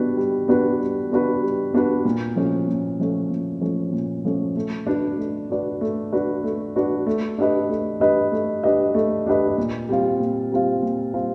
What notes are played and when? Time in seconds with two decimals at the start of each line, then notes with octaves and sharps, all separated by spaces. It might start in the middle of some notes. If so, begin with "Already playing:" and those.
Already playing: G3 B3 D4 F#4 B4
0.17 G3
0.48 B3 D4 F#4 B4
0.79 G3
1.11 B3 D4 F#4 B4
1.42 G3
1.73 B3 D4 F#4 B4
2.05 A#2
2.36 F3 A3 C#4
2.68 A#2
2.99 F3 A3 C#4
3.30 A#2
3.61 F3 A3 C#4
3.92 A#2
4.25 F3 A3 C#4
4.56 A3
4.87 D4 F#4 B4 D5
5.18 A3
5.50 D4 F#4 B4 D5
5.81 A3
6.12 D4 F#4 B4 D5
6.44 A3
6.76 D4 F#4 B4 D5
7.06 A3
7.38 D4 G4 B4 D#5
7.69 A3
8.00 D4 G4 B4 D#5
8.32 A3
8.63 D4 G4 B4 D#5
8.94 A3
9.26 D4 G4 B4 D#5
9.58 A#2
9.89 G3 C4 F4
10.20 A#2
10.52 G3 C4 F4
10.83 A#2
11.14 G3 C4 F4